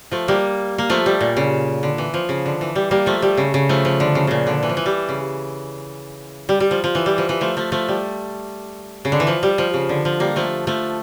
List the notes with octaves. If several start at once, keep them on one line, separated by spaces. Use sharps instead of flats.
F3 A3
G3 A#3
A#3
F3 A3
G3
A#2
C#3
D3
E3
F3
C#3
D3
E3
G3
G3 A#3
F3 A3
G3
C#3
C#3
F3 A3
F3
D3
C#3
A#2 C#3
D3
E3
F3
E3
G3
C#3
G3
G3
F3
F3
E3
G3
F3
E3
F3 A3
F3 A3
F3 A3
G3
C#3
D3
E3
F3
G3
F3
C#3
D3
F3
G3 A#3
F3 A3
F3 A3